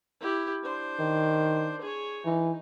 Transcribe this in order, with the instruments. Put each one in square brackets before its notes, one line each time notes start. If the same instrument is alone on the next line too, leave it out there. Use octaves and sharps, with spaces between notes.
[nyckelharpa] E4 G4
D4 C5
[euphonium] D#3
[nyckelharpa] G#4 C#5
[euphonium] E3 [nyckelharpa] D#4